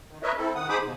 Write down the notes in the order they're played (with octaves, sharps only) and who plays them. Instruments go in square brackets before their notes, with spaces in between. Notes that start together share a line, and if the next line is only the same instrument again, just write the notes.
[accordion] D#3
A#4 B4 C#5 D#5 E5
C4 E4 A4
D#3 F#5 D#6
D#4 G#4 C5 B5 D6 D#6
D#2 B2